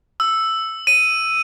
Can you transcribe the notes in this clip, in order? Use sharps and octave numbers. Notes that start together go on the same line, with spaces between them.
E6
D#7